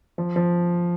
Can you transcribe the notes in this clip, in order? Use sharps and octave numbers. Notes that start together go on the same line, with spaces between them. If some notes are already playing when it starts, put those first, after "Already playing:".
F3
F3